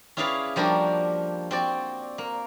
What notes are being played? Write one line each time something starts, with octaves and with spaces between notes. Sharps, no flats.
C#4 E4 G#4 B4 D5 F5
F3 G3 A#3 D4 F#4
C4 F#4 D5
A#3